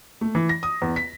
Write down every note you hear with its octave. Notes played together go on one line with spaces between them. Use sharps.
A3
E3
A#6
D#6
E2
B6